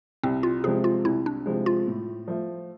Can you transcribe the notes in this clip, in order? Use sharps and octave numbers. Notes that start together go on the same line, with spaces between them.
C2 C4
F4
C3 F3 G#3 G#4
F4
C2 E4
D4
C3 F3 G#3
F4
A2
F3 A3